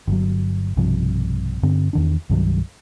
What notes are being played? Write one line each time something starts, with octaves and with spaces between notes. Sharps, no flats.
G1 F#3
B1 G2 C3 F3
G2 D3 C4
E2 D#3 D4
C2 G2 D#3 F#3